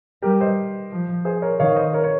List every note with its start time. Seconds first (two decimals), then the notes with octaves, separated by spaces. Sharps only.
0.22 G3 G4 A#4
0.40 C5 D#5
0.92 F3
1.25 G#4 C5
1.42 A#4 C#5
1.59 D#3 C#5 F5
1.76 C5 D#5
1.93 A#4 C#5
2.03 C#5